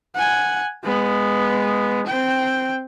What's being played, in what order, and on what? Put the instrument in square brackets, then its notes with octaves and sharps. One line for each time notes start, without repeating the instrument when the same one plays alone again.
[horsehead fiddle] F#5 G#5
G#3 B3
C4 G5